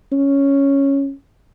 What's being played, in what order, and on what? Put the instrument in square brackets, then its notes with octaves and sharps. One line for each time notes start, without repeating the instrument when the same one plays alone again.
[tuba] C#4